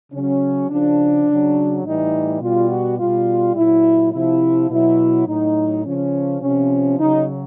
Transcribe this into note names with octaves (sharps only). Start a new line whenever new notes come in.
C#3 F#3 C#4
C#3 F3 D4
C#3 F#3
A2 E3 G3 D#4
B2 G3 F4
F#4
B2 G3 F4
A#2 F#3 E4
C3 F3 E4
B2 F#3 E4
A2 F#3 D#4
C#3 F3 C#4
C3 F3 C#4
C#3 F#3 D#4